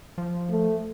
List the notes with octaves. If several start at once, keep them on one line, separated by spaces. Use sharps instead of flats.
F3
A3